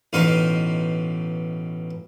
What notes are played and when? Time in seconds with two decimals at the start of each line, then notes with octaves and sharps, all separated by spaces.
0.13 A1 B2 D#4 F5 C6